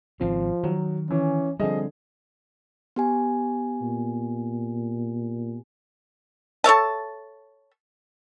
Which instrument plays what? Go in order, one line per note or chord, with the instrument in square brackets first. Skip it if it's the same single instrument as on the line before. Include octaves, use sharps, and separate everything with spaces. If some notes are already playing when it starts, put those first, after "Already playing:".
[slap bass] G#1 C#3 C4 [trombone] F3
[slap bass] D#3 [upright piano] F#3
[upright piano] E3 [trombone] C#4
[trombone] D3 [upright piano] F3 G#4 D#5 [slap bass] G3 C4
[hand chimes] B3 G4 G#5
[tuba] A#2
[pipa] A4 C#5 E5 A5